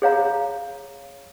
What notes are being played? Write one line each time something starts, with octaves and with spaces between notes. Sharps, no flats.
G#4 C#5 F5 A#5